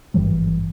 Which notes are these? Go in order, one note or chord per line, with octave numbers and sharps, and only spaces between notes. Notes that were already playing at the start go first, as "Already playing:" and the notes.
G#1 G2 E3 G3